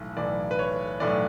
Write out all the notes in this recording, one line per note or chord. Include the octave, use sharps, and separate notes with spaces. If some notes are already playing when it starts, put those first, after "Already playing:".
Already playing: B1 A2 E3
B1 A2 E3 D5
B4
C#5
B1 A2 E3 D5